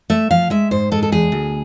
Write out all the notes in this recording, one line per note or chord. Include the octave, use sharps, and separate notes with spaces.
A3 E5
F3 F5
G#3 E5
G#2 C5
G#3 A4
A4
E2 G#4
D2